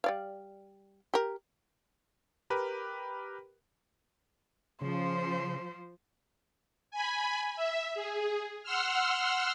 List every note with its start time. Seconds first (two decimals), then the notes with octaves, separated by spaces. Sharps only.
0.04 G3 D5 F5
1.14 G4 A#4
2.50 G4 A#4 B4
4.81 C#3 F3 C5
6.91 G#5 B5
7.56 E5
7.94 G#4
8.63 F#5 C6 E6 F6